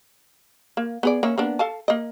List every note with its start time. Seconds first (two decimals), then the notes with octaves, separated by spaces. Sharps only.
0.77 A#3
1.03 B3 G#4 D5
1.23 A#3 C#4 E5
1.38 A#3 B3 D4
1.59 A4 F5 A5
1.88 A#3 D#5